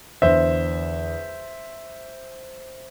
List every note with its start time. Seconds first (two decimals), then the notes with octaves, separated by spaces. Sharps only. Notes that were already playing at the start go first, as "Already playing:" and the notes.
0.22 E2 D3 C5 E5